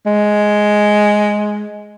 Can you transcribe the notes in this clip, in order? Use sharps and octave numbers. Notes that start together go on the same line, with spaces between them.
G#3